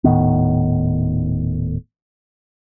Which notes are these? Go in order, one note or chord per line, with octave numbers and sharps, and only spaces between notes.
D#1 A2 D#3 B3